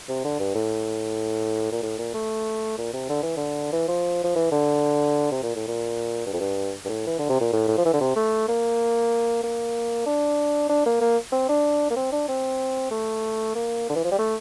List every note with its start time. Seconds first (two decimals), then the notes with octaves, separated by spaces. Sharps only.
0.09 C3
0.24 D3
0.40 G2
0.55 A2
1.72 A#2
1.83 A2
1.99 A#2
2.14 A3
2.78 A#2
2.93 C3
3.09 D3
3.23 E3
3.37 D3
3.72 E3
3.88 F3
4.24 F3
4.36 E3
4.52 D3
5.31 C3
5.43 A#2
5.55 A2
5.68 A#2
6.26 G2
6.33 F2
6.40 G2
6.85 G2
6.89 A2
7.07 E3
7.19 D3
7.29 C3
7.41 A#2
7.53 A2
7.68 A2
7.78 F3
7.85 E3
7.93 D3
8.01 C3
8.16 A3
8.48 A#3
9.43 A#3
10.06 D4
10.69 D4
10.86 A#3
11.01 A#3
11.32 C4
11.49 D4
11.90 A#3
11.96 C4
12.12 D4
12.29 C4
12.91 A3
13.55 A#3
13.90 D3
13.96 E3
14.04 F3
14.11 G3
14.19 A3